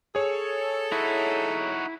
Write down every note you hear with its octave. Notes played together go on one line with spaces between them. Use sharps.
G#4 A4 C#5
D#4 E4 F#4